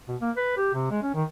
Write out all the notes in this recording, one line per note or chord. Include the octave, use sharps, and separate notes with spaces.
B2
A#3
B4
G4
C3
G#3
C#4
D#3